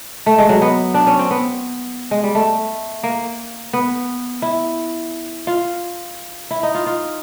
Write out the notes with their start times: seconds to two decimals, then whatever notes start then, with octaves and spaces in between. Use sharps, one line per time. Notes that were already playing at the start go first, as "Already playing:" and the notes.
0.26 A3
0.38 G#3
0.49 F#3
0.62 B3
0.94 D4
1.07 C#4
1.19 C4
1.31 B3
2.11 G#3
2.24 G3
2.35 A3
3.03 A#3
3.73 B3
4.42 E4
5.47 F4
6.51 E4
6.63 D#4
6.75 F4
6.86 F4